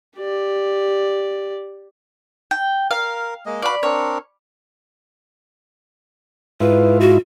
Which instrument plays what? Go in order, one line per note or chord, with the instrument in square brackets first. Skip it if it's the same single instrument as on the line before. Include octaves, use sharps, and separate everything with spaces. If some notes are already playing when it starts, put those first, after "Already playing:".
[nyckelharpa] G4 D5
[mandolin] G5
[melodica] A#4 [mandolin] F5
[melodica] G#3 A#3 D#5
[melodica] F#4 B4 F5 [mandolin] D5 B5
[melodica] C4 D4 A#4 [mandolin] C#5
[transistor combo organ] G#2 E4 F4 [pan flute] B4
[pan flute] F#4